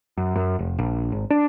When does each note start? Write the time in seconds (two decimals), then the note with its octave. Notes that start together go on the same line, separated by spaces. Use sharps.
0.17 F#2
0.36 F#2
0.59 F1
0.79 A#1
1.12 G#1
1.30 D4